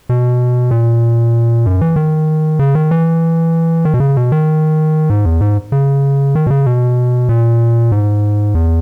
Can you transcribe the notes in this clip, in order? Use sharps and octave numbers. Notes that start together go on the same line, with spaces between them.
B2
A#2
F#2
E3
D#3
C#3
D#3
E3
D#3
B2
C#3
B2
D#3
G#2
E2
G#2
C#3
D#3
B2
C#3
B2
A#2
G#2
E2